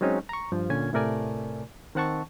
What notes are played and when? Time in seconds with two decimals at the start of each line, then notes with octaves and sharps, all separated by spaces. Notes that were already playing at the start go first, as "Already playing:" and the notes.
0.01 F#3 G#3 C4 C#4 D#4
0.29 A#5 C#6
0.52 G2 F3
0.70 A#2 D3 C#4 G#5 G#6
0.93 A2 C3 A3 A#4 D5 G#5
1.95 D#3 C4 F#5 A5 C#6